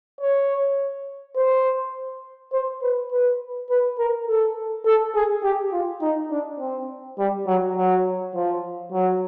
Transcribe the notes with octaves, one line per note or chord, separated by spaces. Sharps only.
C#5
C5
C5
B4
B4
B4
A#4
A4
A4
G#4
G4
F4
D#4
D4
C4
G3
F#3
F#3
F3
F#3